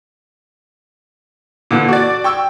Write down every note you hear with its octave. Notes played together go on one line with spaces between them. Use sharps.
A#2 D3 E3
F#4 D5
G5 C#6 E6